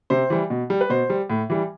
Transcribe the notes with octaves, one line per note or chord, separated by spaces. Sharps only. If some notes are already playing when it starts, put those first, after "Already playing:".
C3 C5
E3 G3
B2
G3
B4
B2 C5
G3
A2
E3 G3